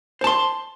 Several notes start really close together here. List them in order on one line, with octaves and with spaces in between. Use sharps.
C5 A5 C6